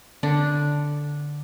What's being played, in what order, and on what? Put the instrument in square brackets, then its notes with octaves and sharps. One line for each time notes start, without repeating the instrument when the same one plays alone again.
[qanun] D3 D4